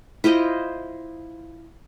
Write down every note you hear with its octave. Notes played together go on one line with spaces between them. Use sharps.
E4 F4 C5 D#5